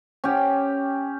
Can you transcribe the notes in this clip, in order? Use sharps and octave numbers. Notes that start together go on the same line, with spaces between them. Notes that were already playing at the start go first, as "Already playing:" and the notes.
C#4 G4